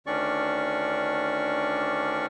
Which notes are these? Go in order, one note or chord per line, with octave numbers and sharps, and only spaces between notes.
D2 D#3 C#4 D4 D5 C#6